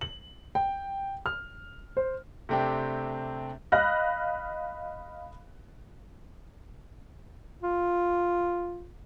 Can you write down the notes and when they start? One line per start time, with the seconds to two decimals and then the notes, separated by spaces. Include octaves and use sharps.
0.01 F#7
0.55 G5
1.26 F6
1.97 C5
2.49 C3 A3 C4 D4 G4
3.72 D#5 F5 B5 F6 F#6 A#6
7.63 F4